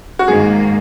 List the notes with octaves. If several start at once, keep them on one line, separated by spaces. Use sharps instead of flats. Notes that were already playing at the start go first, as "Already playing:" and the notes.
F#4
G#2 D#3 A#3 G#4